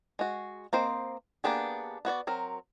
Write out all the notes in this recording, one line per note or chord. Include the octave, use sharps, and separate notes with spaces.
G#3 F#4
A#3 C4 C5 D#5
A#3 B3 D4 G4 G#4
B3 F#4 C#5 D5
F#3 C4 A#4